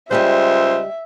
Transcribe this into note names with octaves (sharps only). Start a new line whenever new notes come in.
C#2 G3 G4 C5 D#5 E5